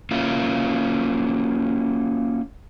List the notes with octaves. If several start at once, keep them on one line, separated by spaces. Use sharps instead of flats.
A#3 C#4 E4 F4